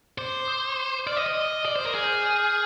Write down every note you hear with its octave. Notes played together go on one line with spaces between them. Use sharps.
C5 D6
D#6
D5 F6
D#5
D#5
D5 D#6
C5
A#4
G#4 F6
G6
F6
D#6
F6